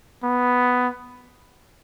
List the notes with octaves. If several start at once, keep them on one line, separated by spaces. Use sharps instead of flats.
B3